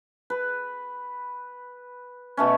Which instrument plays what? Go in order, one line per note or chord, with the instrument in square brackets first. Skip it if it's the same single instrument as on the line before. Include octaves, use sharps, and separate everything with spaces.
[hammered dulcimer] B4
B2 A3 C#4